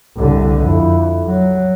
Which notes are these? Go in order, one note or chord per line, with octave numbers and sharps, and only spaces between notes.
C2 D3
F2 E4
F#3